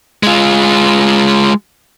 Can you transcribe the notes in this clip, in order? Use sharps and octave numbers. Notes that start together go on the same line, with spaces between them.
G#3 F4